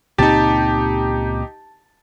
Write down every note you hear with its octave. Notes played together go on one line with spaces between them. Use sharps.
C#2 A#2 C4 D#4 G4 A5